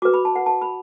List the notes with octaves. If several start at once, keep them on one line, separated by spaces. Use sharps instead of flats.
F#4 B4 D6
B5
A5
F#5
A5
B5